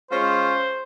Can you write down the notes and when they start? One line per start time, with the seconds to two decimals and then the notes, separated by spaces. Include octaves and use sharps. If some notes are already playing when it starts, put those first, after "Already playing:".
0.11 G#3 C#4 F4 C5